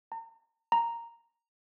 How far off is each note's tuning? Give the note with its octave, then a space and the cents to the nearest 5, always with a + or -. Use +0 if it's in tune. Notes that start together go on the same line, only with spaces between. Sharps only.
A#5 -40
A#5 -5